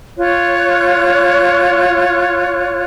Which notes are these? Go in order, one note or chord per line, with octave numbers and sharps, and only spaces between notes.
F4 C#5 F#6